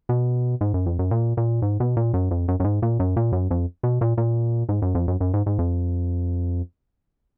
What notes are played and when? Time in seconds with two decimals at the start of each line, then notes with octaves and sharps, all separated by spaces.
0.09 B2
0.61 G#2
0.74 F#2
0.86 F2
0.99 F#2
1.11 A#2
1.37 A#2
1.62 G#2
1.80 B2
1.97 A#2
2.14 F#2
2.31 F2
2.48 F#2
2.60 F#2
2.64 G#2
2.82 A#2
3.00 F#2
3.16 A#2
3.32 F#2
3.51 F2
3.83 B2
4.01 A#2
4.18 A#2
4.69 G#2
4.82 F#2
4.95 F2
5.08 F#2
5.21 F#2
5.34 G#2
5.46 G#2
5.59 F2